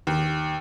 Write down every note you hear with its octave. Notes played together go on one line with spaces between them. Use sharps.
D#2